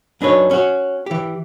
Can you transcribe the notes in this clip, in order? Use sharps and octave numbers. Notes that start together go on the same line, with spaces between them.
F#2 D4 D#4 B4 C#5
C#4 F#4
E3 G4